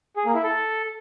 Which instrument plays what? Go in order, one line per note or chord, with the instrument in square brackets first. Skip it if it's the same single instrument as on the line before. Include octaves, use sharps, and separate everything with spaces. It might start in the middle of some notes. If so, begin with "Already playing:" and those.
[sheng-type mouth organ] G#4
A#3
E4
A4